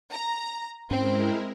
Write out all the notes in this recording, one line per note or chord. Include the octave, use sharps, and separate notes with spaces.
A#5
G#2 G#3 C4 C#4 E4 A#4